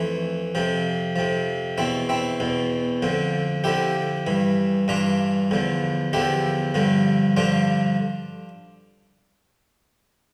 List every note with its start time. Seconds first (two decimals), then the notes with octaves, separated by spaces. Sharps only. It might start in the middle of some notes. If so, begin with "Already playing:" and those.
Already playing: F2 E3 A3
0.55 F2 C3 F3
1.16 F2 C3 F3
1.78 E2 B2 C4 E4
2.09 C4 E4
2.40 E2 B2
3.02 F2 D3 F3
3.64 F2 D3 F3 E4 G4
4.27 G2 E3
4.88 G2 E3 D4 F4
5.51 E2 D3 F3
6.13 E2 D3 F3 E4 G4
6.74 G2 D3 F3
7.37 G2 D3 F3 D4 F4